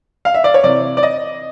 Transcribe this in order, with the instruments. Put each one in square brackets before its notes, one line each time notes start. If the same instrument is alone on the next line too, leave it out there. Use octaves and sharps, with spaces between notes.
[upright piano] F5
E5
D5
C#5
C3 E3 D5
D5
D#5